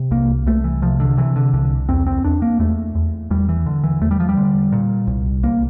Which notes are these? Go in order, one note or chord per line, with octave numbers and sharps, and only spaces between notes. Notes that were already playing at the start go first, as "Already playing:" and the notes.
Already playing: C3
C2 A#3
C2 A3
E3
C3 F3
D3
C3 E3
D3
C2 D3
E2 C4
C4
E2 D4
A#3
E2 A3
E2
E2 G3
E3
D3
E3
E2 A3
G3
F3
G3
D3
A#2
C2
C2 A#3